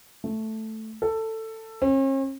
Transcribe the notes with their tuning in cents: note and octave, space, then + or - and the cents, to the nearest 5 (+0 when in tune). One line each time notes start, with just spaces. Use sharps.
A3 +0
A4 +15
C#4 -45